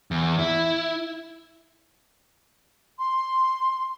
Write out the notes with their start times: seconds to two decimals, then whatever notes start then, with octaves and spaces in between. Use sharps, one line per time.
0.11 E2
0.39 E4
2.99 C6